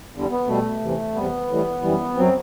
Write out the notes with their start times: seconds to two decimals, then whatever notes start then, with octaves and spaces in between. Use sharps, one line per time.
0.14 E2 D3 G3
0.31 B3
0.47 B2 G3 A3
0.81 E2 C3 E3
1.14 E2 C3 G3 B3
1.48 A2 E3 G3
1.83 F#2 E3 G3
2.16 F#2 F#3 C4